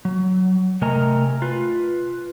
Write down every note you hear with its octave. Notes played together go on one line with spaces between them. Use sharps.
F#3
C3 A3 A#4 D#5 G#5 A#5
F4 B4